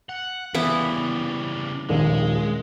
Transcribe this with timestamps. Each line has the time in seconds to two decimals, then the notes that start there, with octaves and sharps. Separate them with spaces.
0.09 F#5
0.54 C#3 E3 G3 B3 E4
1.89 D#1 A#1 D#3 G#3